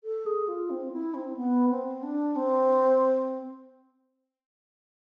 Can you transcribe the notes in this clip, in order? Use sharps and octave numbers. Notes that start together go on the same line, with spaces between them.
A4
G#4
F4
C4
E4
C4
B3
C4
D4
C4